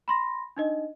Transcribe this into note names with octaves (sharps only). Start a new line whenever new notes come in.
B5 C6 A#6
D4 D#4 D#5